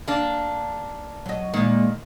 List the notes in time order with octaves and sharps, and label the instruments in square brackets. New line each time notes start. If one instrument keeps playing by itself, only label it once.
[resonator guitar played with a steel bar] A#3 D4
[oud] F#3 D#5
[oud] A#2 G#3 A#3 [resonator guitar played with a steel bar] D#3